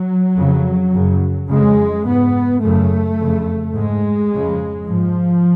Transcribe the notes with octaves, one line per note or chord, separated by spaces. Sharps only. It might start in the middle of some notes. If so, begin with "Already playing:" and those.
Already playing: F#3
F2 C#3
F#2 C#3
F2 C#3 G#3
G#2 B3
F#2 C#3 A3
F2 C#3
G#2 G#3
F2 C#3
G#2 F3